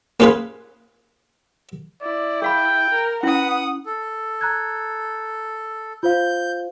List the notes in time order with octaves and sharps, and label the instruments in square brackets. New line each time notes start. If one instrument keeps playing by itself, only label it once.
[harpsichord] A#3 C#4 F4 G#4 B4
[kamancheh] E4 [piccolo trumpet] D5
[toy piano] G#4 F5 B5 [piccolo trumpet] G5
[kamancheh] A#4
[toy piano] C#4 E4 [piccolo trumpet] B4 [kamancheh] F#5 D#6
[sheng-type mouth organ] A4
[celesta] A#5 F#6 G#6
[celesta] F4 C5 F5 [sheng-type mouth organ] G6